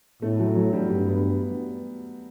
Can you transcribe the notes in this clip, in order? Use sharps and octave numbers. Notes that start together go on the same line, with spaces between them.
A2 A3
F#3
F#3
G3
G2 G3
B3